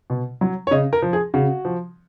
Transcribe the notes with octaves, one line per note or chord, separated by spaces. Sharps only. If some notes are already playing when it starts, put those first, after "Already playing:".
B2
F#3
C#5
C#3 D#5
A#4
F3
G#4
C#3 F#4
F3